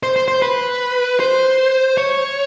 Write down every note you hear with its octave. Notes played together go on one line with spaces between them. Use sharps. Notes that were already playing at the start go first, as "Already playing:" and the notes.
C5
C5
C5
B4
C5
C#5